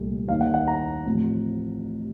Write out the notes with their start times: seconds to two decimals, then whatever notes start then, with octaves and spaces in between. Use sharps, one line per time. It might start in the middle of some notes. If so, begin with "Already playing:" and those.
Already playing: C2 A#2 A3
0.28 D#2 D#3 A#3 D#4 F5
0.41 F#5
0.54 F#5
0.68 A#5
1.06 A1 A2 F3 C4